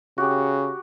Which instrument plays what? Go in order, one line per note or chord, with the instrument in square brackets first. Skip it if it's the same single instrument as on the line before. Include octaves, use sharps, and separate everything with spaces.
[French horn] C#3 [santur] F#4 G4